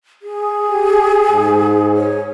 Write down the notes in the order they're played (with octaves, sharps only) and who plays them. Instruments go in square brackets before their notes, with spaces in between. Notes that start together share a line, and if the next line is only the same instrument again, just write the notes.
[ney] G#4
[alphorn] G4
G#2
[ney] C#5